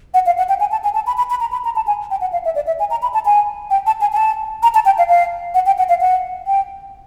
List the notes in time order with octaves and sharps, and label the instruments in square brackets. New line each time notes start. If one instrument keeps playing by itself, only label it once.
[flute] F#5
F5
F#5
G5
G#5
A5
G#5
A5
B5
B5
B5
A#5
B5
A#5
A5
G#5
G5
F#5
F5
E5
D5
E5
G#5
A#5
B5
A5
G#5
G5
A5
G#5
G#5
A5
A#5
A5
G5
F5
F5
F#5
G5
F#5
F5
F#5
G5